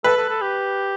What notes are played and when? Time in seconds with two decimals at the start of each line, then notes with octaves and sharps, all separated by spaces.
0.04 A4 B4
0.17 A4
0.29 A4
0.42 G4